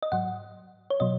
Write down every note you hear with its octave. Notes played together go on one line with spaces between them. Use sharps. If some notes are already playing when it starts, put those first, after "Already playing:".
D#5
G#2 F#3 F#5
C#5
B2 F#3 D#5